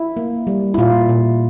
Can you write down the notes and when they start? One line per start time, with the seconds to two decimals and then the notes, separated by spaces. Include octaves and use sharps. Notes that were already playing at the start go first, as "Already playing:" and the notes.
Already playing: E4
0.17 A#3
0.47 G3
0.74 E4
0.78 A#2 F4
1.09 A#2